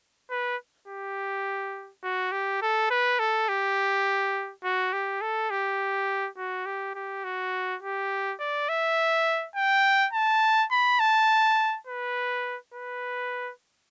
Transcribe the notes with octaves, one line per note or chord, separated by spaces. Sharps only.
B4
G4
F#4
G4
A4
B4
A4
G4
F#4
G4
A4
G4
F#4
G4
G4
F#4
G4
D5
E5
G5
A5
B5
A5
B4
B4